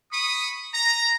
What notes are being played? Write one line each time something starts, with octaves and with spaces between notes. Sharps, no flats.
B5 C#6 D#6
A#5